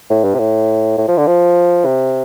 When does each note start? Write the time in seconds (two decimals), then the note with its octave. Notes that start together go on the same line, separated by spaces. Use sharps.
0.10 A2
0.24 G2
0.34 C3
0.39 A2
0.98 A2
1.08 F3
1.17 D3
1.27 F3
1.86 C3